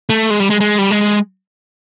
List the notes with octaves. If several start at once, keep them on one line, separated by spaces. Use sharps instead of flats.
A3
G#3
G3
G#3
G#3
G3
G#3